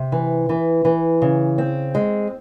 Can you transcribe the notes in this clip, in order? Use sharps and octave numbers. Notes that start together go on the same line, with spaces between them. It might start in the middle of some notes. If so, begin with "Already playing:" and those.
Already playing: C3
E3
E3
E3
C#3
C4
G#3